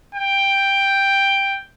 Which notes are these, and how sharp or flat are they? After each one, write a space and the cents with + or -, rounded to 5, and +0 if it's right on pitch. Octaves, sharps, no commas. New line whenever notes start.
G5 +5